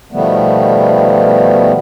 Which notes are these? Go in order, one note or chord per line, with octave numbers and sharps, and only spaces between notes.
B2 D#3 F3 G3 A3 B3